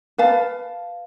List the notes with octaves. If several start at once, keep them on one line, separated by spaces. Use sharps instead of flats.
B4 F5 A5